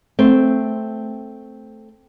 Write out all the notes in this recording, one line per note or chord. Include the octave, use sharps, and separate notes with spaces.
A3 C4